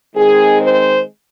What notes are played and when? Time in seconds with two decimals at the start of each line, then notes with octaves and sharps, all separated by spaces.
0.15 D#3 G#3 C4 G#4
0.61 C5